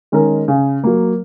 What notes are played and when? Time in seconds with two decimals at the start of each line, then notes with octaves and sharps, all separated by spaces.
0.12 D#3 G#3 C#4 A#4
0.48 C#3
0.84 F#3 A#3